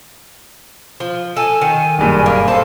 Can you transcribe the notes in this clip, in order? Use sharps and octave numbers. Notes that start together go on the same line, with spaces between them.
F3
A4 G#5
D#3
F#1 G2 A#2
A#3
A4 C5 F5